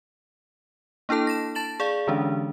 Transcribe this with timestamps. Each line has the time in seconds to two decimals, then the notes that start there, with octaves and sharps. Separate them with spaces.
1.09 A#3 D4 E4 A4 A5
1.27 A#6 E7
1.55 A5 A6 E7 F#7
1.80 G#4 D5 F5
2.07 D3 E3 G#3 C#4 D4